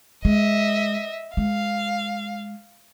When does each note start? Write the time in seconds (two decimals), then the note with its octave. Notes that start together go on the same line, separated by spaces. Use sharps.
0.25 G#3 D#5 E5
1.37 G#3 F5